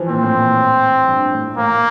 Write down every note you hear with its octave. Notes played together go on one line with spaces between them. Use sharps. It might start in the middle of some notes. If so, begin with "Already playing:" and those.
Already playing: E3 F3
A#2 C4
A2
A#2
G2
A2
A2 A#3
A#2